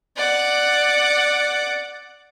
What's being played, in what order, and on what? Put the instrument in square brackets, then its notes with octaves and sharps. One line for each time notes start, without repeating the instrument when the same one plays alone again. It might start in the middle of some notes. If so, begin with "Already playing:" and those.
[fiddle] D5 F#5